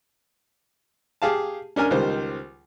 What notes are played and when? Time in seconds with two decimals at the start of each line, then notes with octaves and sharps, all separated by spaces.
1.22 G4 G#4 F5 A5
1.76 C#4 D4 A#4 G#5
1.91 C#2 D#3 G3 C5